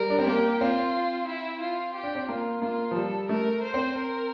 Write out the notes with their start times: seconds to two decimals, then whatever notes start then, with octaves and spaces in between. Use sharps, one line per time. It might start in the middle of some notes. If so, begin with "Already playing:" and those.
Already playing: G3 A#4
0.10 D4
0.19 C4
0.26 A#3 G4
0.60 C4 F4
1.28 E4
1.61 F4
1.95 G4
2.03 D4
2.15 C4
2.28 A#3 F4
2.62 A#3 F4
2.91 F3
2.95 G3 A4
3.29 A3 A#4
3.63 C5
3.74 C4
3.96 A#4